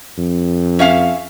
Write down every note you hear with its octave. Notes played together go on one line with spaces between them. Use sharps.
F2
C#4 E5 F5